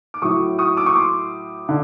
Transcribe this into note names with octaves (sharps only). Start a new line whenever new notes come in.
D6
A2 F#3 C#6 D#6
C#6 D#6
D6 E6
C#6 D#6
C6 D6
D3